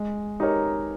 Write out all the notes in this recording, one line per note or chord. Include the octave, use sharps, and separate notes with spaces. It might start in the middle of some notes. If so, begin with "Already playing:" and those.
Already playing: G#3
D#4 G4 A#4 C#5